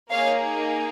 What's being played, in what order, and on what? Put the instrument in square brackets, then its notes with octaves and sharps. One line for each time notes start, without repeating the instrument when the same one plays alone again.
[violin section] A#3 D#4 G#4 C#5 F5